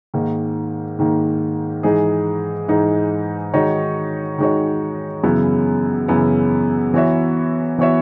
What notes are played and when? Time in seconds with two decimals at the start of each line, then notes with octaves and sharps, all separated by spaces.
0.14 G#2 D#3 A#3
0.99 G#2 D#3 A#3
1.83 G#2 E3 G#3 D#4 G#4
2.68 G#2 E3 G#3 D#4 G#4
3.53 D#3 G#3 D#4 F#4 C#5
4.38 D#3 G#3 D#4 F#4 C#5
5.23 F#2 C#3 E3 B3 E4
6.08 F#2 C#3 E3 B3 E4
6.94 E3 B3 F#4 C#5 E5
7.78 E3 B3 F#4 C#5 E5